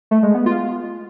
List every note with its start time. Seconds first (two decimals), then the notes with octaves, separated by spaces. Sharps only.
0.11 A3
0.23 G#3
0.34 B3
0.46 F4